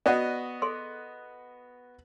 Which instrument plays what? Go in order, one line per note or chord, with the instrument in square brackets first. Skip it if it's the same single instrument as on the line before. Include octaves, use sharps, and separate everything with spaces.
[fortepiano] B3 F#4 D#5 [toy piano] D5 F#5
[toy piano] G#4 A4 C6